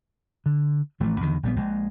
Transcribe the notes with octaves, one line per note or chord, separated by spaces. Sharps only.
D3
A1 E3 F3 A3
E2 D3 D#3
A#1 G3 B3
A#1 G#3